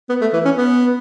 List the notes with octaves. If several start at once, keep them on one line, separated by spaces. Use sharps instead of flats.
B3
A3
E3
C#4
B3